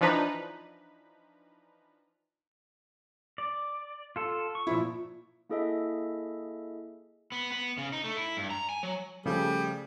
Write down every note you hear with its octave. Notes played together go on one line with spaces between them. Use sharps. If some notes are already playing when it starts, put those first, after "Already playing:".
E3 F3 D4 D#4 B4 A#5
D5
F4 A4
C#6
A#2 F3 E4
A#3 E4 G#4 A4 D#5 E5
B3
B3
C#3
D#4
A3
E4
G2
A#5
G#5
F#3
C#3 F3 G3 A3 G#4